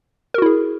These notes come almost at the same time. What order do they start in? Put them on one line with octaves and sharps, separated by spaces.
A#4 F#4 E4 G#4